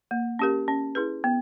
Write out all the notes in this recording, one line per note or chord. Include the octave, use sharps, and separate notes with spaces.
A#3
C#4 G4 A#4
C#4
E4 G#4 B4
B3